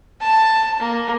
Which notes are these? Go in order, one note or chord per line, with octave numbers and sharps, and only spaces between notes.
A5
A#3